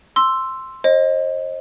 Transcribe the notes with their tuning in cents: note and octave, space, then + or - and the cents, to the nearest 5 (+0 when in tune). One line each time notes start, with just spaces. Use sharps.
C6 +5 E6 +5
C5 +35 D#5 +0